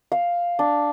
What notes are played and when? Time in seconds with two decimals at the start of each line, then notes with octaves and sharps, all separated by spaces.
0.12 F5
0.59 D4